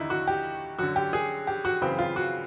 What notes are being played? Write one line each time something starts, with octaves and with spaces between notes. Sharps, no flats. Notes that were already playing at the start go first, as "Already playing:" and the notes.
Already playing: D#2 D3 D#4 E4
F#4
G4
F#2 D3 F#4
G4
G#4
G4
F#4
F#2 C#3 E3 C4
F4
F#4